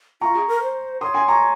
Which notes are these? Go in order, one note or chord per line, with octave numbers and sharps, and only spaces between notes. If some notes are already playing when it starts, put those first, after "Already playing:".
F4 A#5 C#6
G#4
A#4
C5
C#5 C6 D#6
G#5 C6
A#5 C#6